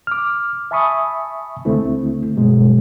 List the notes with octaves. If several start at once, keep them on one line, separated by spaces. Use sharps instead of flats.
D6 F6
E5 G#5 A5 B5 C#6 D#6
C#2 D3 A3 C4 E4
G2 B2 F#3 G#3